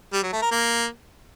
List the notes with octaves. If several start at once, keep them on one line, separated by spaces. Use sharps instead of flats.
G3
F#3
A3
A#4
A#3